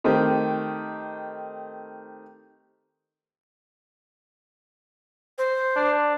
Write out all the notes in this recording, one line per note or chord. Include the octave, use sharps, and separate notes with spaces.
D#3 A3 C4 G4
C5
D4